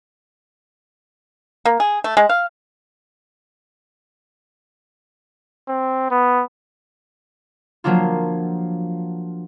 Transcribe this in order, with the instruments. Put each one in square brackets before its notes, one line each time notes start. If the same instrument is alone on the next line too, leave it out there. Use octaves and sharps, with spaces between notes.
[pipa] A#3
G#4
A3
G#3
F5
[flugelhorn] C4
B3
[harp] F3 F#3 A#3 D4 F4